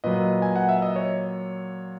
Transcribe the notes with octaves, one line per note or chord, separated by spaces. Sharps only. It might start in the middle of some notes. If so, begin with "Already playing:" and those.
A#2 F#3 B4 D#5
G#5
F#5
E5
D#5
C#5